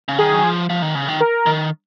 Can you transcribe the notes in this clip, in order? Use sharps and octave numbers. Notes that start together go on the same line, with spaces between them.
C#3
D#3 G#4
F#3
F3
F3
D#3
C#3
D#3
A#4
D#3